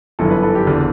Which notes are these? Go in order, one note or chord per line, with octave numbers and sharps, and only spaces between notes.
G1 F#2 E3 A4
B4
A4
G4
F#1 E2 D3